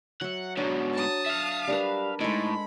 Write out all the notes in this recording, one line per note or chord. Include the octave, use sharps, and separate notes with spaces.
F#3 E5 F#5
G#2 B2 F#3 D4
A5 D#6
E5 F5
G3 D4 A#4 B4
A2 G#3 D#4 A4 B5